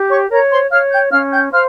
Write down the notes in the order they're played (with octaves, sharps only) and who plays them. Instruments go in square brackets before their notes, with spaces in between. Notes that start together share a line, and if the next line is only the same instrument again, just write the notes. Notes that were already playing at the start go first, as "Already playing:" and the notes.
Already playing: [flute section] G4
C#5 C#6
A#4 C#5 A#5
C5 C6
C#5 F5 F6
G5 G6
C#4 F5 F6
G5 G6
C5 F5 F6